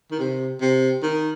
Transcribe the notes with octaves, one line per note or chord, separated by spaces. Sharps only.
D#3
C3
C3
D#3